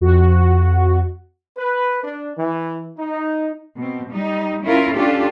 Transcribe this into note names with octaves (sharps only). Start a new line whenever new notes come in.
F2 F#4
B4
D4
E3
D#4
B2 C4
G3 D#4
C#4 E4 F4 A#4
C#4 D4 F4 G4 A4